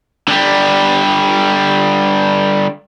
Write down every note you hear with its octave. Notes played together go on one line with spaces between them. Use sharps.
D3 G3